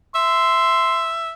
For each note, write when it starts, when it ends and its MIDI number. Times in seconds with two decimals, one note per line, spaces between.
0.15 1.33 76
0.15 1.12 84